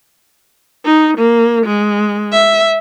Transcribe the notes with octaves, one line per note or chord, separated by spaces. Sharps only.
D#4
A#3
G#3
E5